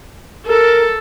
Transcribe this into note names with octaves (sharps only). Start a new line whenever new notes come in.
A4 A#4